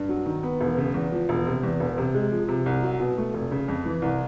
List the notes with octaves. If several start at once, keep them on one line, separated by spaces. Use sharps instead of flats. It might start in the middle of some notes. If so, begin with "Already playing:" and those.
Already playing: G2
F#3
D#3
B3
E1
C#3
E2
F3
E1
C3
E2
E1
C3
G#3
F3
C3
C2
F#3
B2
A3
F1
C#3
F2
E3
C2